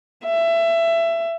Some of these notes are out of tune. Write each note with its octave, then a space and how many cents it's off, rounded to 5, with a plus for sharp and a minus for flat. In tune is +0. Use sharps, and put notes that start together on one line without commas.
E5 +20